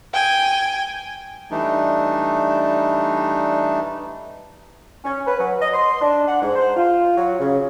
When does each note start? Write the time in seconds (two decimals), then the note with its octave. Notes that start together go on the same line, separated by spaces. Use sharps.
0.14 G5 G#5
1.51 E3 G3 A3 D4 D#4
5.05 C#4
5.27 B4
5.39 F#3
5.62 D#5
5.74 C6
6.01 D4
6.28 F#5
6.42 G#2
6.56 C5
6.76 F4
7.17 F#3
7.40 C#3